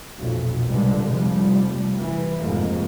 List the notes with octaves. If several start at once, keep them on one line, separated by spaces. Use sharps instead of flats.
B1 F2 A#2
C2 G2 A#2 D3 G#3
F1 F3 G3
E3
F1 F2 G#2 G#3 A#3